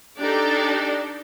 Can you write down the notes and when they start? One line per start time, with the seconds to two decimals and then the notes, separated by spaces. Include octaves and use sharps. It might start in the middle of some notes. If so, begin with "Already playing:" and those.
0.18 D4 D#4 G4 A4 D5